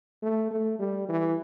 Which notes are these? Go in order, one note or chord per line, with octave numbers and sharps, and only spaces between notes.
A3
A3
G3
E3